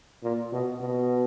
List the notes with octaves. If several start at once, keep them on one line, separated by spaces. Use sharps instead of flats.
A#2
B2
B2